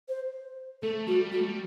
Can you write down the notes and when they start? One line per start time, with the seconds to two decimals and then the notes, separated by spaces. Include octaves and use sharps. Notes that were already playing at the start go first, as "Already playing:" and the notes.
0.09 C5
0.83 A3 A4
1.07 G3 F#4
1.32 G3 F#4
1.40 A3
1.47 G3